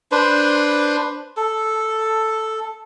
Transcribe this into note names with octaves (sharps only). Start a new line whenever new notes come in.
D4 B4 C5
A4